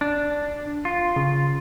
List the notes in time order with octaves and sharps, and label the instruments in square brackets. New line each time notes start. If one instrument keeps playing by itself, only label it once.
[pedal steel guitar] D4
F4
[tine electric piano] C#3